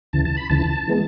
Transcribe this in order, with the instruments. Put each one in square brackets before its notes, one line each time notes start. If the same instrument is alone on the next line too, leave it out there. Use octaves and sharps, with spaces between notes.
[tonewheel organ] D2 C#3 E3 A5
A5
B5
D2 C#3 E3 A5
E3 G#3 B3